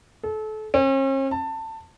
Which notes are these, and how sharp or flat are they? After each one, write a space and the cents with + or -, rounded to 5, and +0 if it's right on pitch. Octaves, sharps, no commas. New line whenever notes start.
A4 -30
C#4 -45
A5 +20